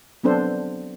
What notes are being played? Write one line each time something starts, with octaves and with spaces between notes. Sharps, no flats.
F#3 B3 C4 D4 A4 C5